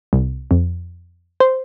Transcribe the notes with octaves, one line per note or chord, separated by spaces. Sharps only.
C2
F2
C5